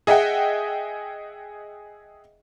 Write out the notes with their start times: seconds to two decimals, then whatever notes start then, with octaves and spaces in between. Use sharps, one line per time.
0.07 G#4 D#5 E5 F#5 G5